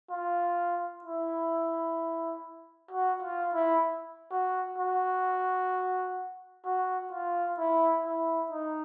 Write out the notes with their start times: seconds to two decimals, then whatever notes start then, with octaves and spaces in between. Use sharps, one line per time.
0.11 F4
1.04 E4
2.91 F#4
3.22 F4
3.54 E4
4.31 F#4
4.78 F#4
6.65 F#4
7.12 F4
7.58 E4
8.06 E4
8.52 D#4